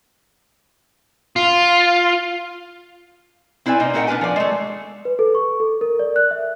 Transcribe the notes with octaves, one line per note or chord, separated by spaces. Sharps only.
F4
C4 E4 B4 D5 G#5
C3 A#3 C4 D#4
A#2 A3 D#4 A#4 F#5 G5
B3 D4 A#4 B4 G#5
F3 D5
G#3 A3
B4
A4
C#6
A4
A#4
D5
F#6
E5